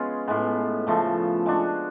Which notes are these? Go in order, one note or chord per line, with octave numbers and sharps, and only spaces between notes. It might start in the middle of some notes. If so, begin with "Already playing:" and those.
Already playing: G#3 B3 C#4 F4 G#4
A2 G#3 B3
C#3 F3 A3
G#3 D4 F#4